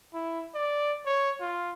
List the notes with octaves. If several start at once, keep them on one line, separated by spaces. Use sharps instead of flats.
E4
D5
C#5
F4